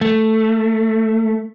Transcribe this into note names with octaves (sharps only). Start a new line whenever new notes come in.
A3